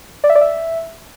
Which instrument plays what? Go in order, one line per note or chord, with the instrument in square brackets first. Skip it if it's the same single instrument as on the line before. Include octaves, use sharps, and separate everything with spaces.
[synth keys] D5
E5
D5
E5